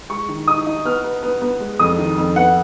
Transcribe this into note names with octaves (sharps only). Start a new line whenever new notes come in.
G#3 C#6
D#3
D#4 D#6
D#4
B3 F6
B3
B3
B3
G#3
F2 D#6
D#3
F2
B3 F#5